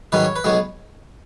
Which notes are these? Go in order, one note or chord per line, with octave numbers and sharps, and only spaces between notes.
G#2 D#3 F#3 C#4 B4
C#5
B4
B1 B2 G#3 B3 C#5